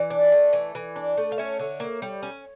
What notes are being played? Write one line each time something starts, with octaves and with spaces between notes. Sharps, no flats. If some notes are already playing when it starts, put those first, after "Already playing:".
Already playing: E3 D5
D4
A3
E3
E3
D4
A3
F5
C#4 C#5 E5
D3
A#3
G3
C#4